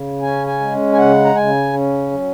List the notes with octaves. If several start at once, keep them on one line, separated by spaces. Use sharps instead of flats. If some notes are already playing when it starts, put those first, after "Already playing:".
Already playing: C#3
C#4 G#5
G#5
G#3
G#5
C#3 F#5
A#5
C#3 G#5
C#4
F#3